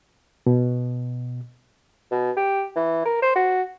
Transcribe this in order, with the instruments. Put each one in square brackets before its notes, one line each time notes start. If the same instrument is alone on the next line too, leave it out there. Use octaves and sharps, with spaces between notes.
[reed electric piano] B2
[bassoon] B2
G4
E3
A#4
C5
F#4